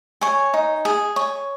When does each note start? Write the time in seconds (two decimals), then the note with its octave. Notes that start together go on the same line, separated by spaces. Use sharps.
0.21 C#5 G#5
0.54 D#4
0.85 G#4
1.16 C#5